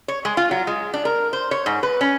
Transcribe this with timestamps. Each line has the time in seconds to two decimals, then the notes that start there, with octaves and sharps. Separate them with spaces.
0.08 C#5
0.25 G#3
0.37 F4
0.51 F#3
0.67 G#3
0.94 D4
1.05 A#4
1.33 C5
1.51 C#5
1.66 G#2
1.83 B4
2.01 C#4